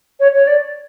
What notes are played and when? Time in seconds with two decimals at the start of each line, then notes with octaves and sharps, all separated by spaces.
0.20 C#5
0.35 C#5
0.47 D5